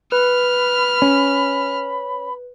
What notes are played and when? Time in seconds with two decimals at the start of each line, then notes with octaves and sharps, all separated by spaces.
0.12 B4 B5 F6
1.02 C#4